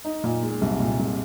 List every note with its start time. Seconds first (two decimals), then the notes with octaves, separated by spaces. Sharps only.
0.04 D#4
0.24 A#2
0.43 G#3
0.61 C2
0.80 A#2
0.99 C2